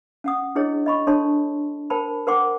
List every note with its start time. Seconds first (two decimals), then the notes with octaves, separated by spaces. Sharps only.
0.24 C#4 F#5 D#6
0.55 D4 E4 G#4 C#5 D#5
0.86 D#5 B5 C#6
1.07 D4 A4 C#5 A5 C6
1.90 A#4 C5 G5 A5 B5
2.27 A#4 C5 F#5 G5 C6 D6